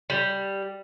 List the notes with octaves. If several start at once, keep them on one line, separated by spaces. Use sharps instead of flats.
G3